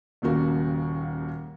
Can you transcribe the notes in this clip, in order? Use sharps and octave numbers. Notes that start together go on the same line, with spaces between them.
D#1 D#2 C#3 A#3 F#4